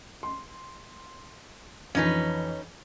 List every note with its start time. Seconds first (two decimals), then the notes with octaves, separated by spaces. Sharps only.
0.23 C6
1.95 F2 E3 C#4 D#4 B4